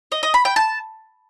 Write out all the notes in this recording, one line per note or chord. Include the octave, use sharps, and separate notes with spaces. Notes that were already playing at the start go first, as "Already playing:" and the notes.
D#5
D#5
B5
G5
A5